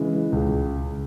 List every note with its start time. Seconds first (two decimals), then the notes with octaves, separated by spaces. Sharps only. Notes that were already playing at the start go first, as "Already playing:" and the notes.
Already playing: C#3 E3 G#3
0.32 C#2